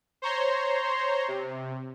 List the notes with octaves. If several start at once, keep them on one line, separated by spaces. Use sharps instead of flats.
C5 C#5 A#5 C6
C3